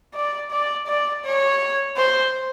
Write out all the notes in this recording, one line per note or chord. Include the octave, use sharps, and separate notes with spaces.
D5
D5
D5
C#5
C5